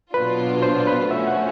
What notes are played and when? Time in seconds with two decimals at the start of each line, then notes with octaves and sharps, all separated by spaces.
0.14 B2 F#3 B3 D4 F4 B4
0.62 C5
0.87 B4
1.11 F3 A3 C#4 F#4 E5
1.27 F#5